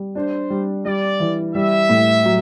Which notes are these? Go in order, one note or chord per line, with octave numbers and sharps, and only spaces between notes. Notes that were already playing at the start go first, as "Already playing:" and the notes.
Already playing: G3
D4 C5
G3
G3 D5
E3
G3 E5
A2
F#3